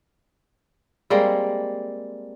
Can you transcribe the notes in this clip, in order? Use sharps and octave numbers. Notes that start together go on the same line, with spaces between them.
G3 G#3 A#3 C4